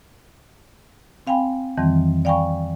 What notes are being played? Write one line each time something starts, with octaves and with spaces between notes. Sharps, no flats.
C4 F5 G5 G#5 B5
F2 D#3 E3 G3 C4
D5 F5 G5 G#5 B5 C#6